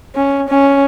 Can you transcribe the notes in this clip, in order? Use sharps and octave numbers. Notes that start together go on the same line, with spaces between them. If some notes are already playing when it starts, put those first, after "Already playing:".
C#4
C#4